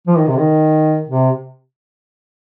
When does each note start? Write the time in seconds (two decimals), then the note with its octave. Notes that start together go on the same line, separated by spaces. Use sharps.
0.07 F3
0.18 D#3
0.28 C3
0.38 D#3
1.08 C3